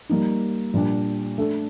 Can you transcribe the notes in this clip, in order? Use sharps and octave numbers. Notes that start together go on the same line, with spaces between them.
G3 A#3 D#4
A#2 G3 D4 G4
A3 D4 A4